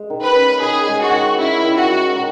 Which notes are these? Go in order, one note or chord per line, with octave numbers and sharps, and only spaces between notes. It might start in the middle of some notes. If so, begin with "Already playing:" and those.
Already playing: G#3
D#3
B4
C#4
D#3 G#4
G#3
F#4
D#3
C#4 E4
D#3
F#4
G#3
D#3